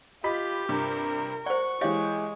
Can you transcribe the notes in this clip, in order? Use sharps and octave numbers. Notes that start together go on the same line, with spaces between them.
F4 G4 D#5 B5 B6
G2 C3 A#4
C5 D5 F#5 C#6
E3 G#3 G4 C#5 D#5 F5